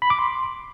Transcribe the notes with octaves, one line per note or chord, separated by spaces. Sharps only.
B5
D6
C6